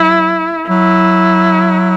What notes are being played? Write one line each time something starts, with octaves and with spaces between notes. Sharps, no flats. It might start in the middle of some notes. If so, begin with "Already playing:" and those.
Already playing: F#3 E4
F#3 E4